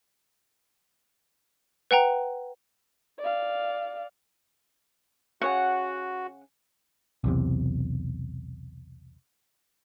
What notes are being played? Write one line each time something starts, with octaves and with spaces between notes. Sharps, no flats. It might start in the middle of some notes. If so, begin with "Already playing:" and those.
B4 F#5 G5 A#5
D5 F5
C#3 F#4 C#5 F#5 G#5
B1 E2 C3